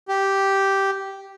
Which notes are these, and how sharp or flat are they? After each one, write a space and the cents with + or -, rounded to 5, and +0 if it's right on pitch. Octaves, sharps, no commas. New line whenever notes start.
G4 -5